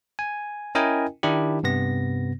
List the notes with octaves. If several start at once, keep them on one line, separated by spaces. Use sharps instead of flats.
G#5
C#4 E4 A#4 D#5 G5 G#5
D#3 D4 E4 G4
G2 C3 B3 A#6